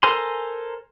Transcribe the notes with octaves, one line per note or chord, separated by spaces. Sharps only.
A4 A#4 C5 G#5 C6